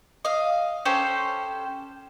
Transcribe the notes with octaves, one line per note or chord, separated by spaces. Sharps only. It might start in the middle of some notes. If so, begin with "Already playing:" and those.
D#5 F5
C#4 G4 A4 C5